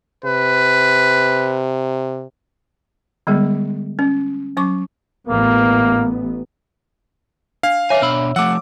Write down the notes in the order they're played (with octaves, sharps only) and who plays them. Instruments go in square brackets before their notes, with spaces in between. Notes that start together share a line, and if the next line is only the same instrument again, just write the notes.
[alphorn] C3 [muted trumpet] B4
[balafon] D3 G3 G#3 B3 G#4
C#4
F#3 C#4 C#6 D6
[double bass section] A1 B3 [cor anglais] A#3
[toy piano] D4 [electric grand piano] F5
[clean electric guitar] B4 G#5 [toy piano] C#5 E5 D6
[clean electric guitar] B2 D4 B5 [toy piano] E6
[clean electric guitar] F3 A3 [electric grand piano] F#5 D6 [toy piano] E6